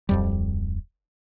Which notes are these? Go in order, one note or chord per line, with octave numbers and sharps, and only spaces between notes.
D1 F2 G3